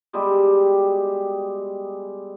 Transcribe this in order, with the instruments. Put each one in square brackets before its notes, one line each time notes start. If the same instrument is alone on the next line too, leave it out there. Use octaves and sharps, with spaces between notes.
[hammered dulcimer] B2 G3 G#3 G4